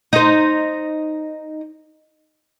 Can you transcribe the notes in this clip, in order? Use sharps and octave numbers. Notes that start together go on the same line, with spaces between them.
D#4 C5